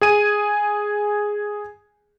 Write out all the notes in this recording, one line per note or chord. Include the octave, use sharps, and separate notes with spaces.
G#4 G#5 D#7